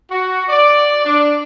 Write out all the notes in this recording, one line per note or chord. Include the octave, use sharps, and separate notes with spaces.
F#4
D5
D4